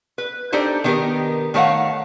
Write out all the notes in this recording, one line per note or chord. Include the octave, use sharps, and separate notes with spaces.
B4
D4 D#4 G4 A4 C5
D#3 B3 D4 D#4 G4 A#4
D#3 A3 C#5 F5 F#5